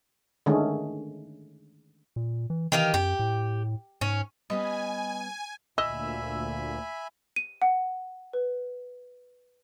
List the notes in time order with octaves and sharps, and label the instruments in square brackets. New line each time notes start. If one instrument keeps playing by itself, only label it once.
[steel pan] D3 D#3 G#3 A3 C#4
[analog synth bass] A#2
E3
[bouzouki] D#3 G4 F5 [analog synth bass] E3
[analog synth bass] F#2 [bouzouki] G4
[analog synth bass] A2
[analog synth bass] G#2 [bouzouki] C#4
[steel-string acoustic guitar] G3 B3 C#4 [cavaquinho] D#5 B5 [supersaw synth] G#5
[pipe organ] D2 A#2 [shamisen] D#5 [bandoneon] E5 G#5 B5 [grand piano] E6
[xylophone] D#7
F#5
B4